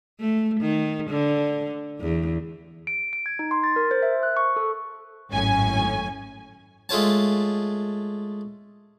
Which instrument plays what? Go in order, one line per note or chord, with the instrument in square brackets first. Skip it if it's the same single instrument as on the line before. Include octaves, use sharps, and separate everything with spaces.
[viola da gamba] A3
D#3
D3
E2
[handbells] D7
D7
G#6
D#4
C6
A6
A#4
C5
E5
F#6
C#6
A4
[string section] G#1 F#2 A2 C#4 G#5
[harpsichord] G#3 A3 F4 C#5 A5